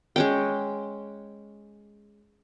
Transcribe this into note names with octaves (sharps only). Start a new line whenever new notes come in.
G#3 C#4 G5